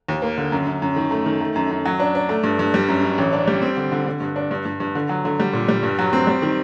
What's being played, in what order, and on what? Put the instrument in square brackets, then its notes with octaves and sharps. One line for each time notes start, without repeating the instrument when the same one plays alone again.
[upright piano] D#2
A#3
D3
F#2
F#2
F#2
D#3
A3
D#3
A3
F#2
F#2
F#3
D4
D4
A3
G2
G2
G3
F#2
F#2
A1
D4
G3
C4
D3
D3
D3
G2
D4
G2
G2
G2
D3
F#3
D3
G3
A#2
G3
G2
F#3
C4
G3
D#3